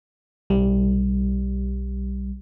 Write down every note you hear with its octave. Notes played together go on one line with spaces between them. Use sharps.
B1 G3